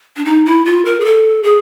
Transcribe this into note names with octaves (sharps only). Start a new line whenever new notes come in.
D4
D#4
E4
F4
A#4
G#4
A4
G#4